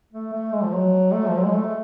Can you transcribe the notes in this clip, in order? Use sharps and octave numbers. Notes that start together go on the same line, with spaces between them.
A3
A3
G#3
F3
F#3
A3
F3
F#3
G#3
A3